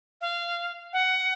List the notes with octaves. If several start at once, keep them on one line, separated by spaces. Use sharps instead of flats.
F5
F#5